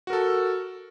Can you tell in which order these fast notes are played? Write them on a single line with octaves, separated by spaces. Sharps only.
F#4 A#4 A4